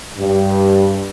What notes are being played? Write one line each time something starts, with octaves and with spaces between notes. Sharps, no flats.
G2